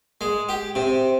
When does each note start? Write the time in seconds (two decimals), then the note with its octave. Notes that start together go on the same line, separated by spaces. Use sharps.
0.21 G#3
0.49 G4
0.75 C3